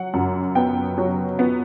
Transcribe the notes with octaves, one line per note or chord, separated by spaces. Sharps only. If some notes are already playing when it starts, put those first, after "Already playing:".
Already playing: F#3 F#5
F#2
B3 G5
F#3
B3